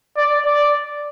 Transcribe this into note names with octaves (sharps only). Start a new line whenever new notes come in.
D5
D5